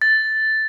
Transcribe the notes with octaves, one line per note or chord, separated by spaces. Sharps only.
A6